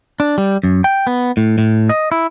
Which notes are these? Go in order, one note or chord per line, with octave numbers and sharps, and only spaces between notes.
D4
G3
F#2
G5
B3
A2
A2
D#5
E4